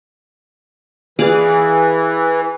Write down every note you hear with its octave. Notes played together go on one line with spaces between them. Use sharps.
E3 G#4 D5 F5